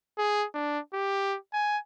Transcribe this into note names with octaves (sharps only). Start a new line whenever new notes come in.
G#4
D4
G4
G#5